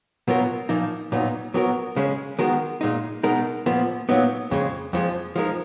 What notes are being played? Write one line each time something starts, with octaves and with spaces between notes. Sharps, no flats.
B2 F#3 B3 F4 A#4
A#2 F3 A#3 D#4
A#2 F#3 B3 D#4
F#3 B3 F#4 A#4
C#3 G#3 C#4
D#3 G#3 B3 F#4 A#4
A#2 G#3 D#4
B2 G#3 D#4 A#4
A#2 F3 B3
A#2 F#3 B3 D#4
F2 C#3 G#3
F2 F3 G#3
F3 G#3 D#4 A#4